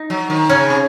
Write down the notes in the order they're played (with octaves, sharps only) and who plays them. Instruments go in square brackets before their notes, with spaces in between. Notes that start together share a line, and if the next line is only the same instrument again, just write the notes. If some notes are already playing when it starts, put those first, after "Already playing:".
Already playing: [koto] D#4
[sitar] F#3
D#3
[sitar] C#3 [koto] C#4
[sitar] C3